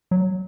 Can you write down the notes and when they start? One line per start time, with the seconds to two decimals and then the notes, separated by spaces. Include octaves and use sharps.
0.11 F#3